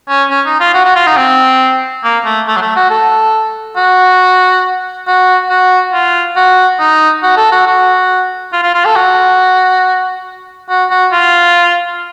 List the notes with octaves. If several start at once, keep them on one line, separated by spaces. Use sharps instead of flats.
C#4
C#4
D#4
F4
F#4
F#4
F4
D#4
C4
A#3
A3
A3
F#3
A3
F#4
A4
F#4
F#4
F#4
F4
F#4
D#4
F#4
A4
F#4
F#4
F4
F4
F4
A4
F#4
F#4
F#4
F4